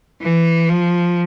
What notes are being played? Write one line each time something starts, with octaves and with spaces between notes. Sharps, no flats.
E3
F3